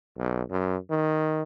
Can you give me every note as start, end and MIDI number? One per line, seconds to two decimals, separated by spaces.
0.18 0.42 35
0.51 0.77 42
0.90 1.42 51